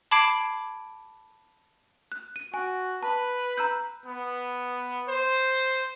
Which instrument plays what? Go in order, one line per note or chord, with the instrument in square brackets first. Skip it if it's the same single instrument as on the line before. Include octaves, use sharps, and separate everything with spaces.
[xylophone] A5 B5 D6 G#6 C7 D7
F#6
D#7
[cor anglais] F#4 [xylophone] G#5
[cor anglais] B4 [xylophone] A5
[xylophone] A#5 E6 G6
[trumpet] B3
C5